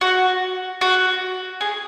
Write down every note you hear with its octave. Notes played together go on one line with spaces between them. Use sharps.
F#4
F#4
G#4